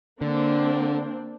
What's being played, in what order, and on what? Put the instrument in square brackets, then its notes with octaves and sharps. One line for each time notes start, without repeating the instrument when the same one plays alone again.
[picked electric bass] D3 [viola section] A#3 C4 D4